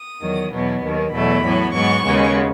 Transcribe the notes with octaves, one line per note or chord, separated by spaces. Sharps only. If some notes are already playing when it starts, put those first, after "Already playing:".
Already playing: D#6
E2 D#3 F#3
E2 B2 F#3 B3
D#2 D#3 F#3
E2 B2 F#3 A3 B5
A2 F#3 B3
G#2 F#3 B3 C#6
D#2 C#3 G#3 B3